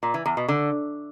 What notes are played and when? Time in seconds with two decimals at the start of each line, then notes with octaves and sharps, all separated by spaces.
0.03 A#2
0.14 E3
0.26 E2
0.37 B2
0.48 D3